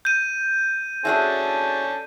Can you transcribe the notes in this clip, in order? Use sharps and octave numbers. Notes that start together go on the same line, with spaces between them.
G6 D#7
C#4 D4 E4 F#4 G#4 A4